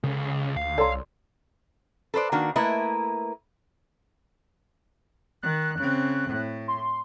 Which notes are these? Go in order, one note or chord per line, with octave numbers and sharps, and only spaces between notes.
C#2 C#3 A4
D2 F5
C2 A4 C#5 D5 A#5 C6
A4 B4 C5 D5
D#3 A#3 D4 F#4
A3 A#3 E4 A#4 B4 D#5
D#3 F#6
C#3 C4
A2
C6